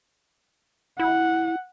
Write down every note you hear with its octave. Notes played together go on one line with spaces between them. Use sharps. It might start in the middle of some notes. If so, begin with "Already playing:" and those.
E4 F#5